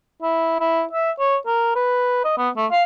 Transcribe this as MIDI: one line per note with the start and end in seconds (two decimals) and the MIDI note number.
0.22 0.59 64
0.60 0.83 64
0.93 1.11 76
1.19 1.36 73
1.47 1.75 70
1.76 2.20 71
2.25 2.34 75
2.37 2.49 59
2.57 2.66 57
2.71 2.83 77